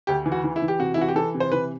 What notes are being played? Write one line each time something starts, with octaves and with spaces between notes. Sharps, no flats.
D2 G4
E3
F#4
E3
E4
E3
G4
C3 F#4
E4
E3 F#4
G4
E3 A4
C3
C5
E3 B4